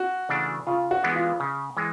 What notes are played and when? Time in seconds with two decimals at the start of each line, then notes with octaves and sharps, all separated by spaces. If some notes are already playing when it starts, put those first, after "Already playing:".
Already playing: F#4
0.29 C#3 E3 A3 D4
0.67 C#3 F4
0.91 F#4
1.03 E3 G#3 B3 D4
1.16 F4
1.40 C#3
1.77 E3 G#3